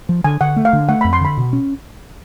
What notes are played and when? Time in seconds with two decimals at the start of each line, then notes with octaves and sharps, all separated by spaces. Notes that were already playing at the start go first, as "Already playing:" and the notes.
0.09 F3
0.24 D3 G#5
0.41 D3 F#5
0.56 A3
0.65 F5
0.73 D3
0.89 A3 F#5
1.01 F2 B5
1.13 C6
1.20 D3 B5
1.37 B2
1.53 C#4